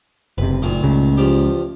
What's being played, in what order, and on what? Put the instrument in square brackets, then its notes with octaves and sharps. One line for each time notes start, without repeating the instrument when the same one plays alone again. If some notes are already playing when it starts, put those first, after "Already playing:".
[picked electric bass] F#1 C3 [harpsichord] B4
[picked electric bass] F#1 [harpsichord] D2 A#2 D#3
[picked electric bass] C#2 C#3
[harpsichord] E2 F3 G4